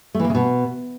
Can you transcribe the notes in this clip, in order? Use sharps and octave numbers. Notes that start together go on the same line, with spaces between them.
A3
E3
A#3
C#3
B2